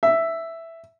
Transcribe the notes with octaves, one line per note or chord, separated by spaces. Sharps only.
E5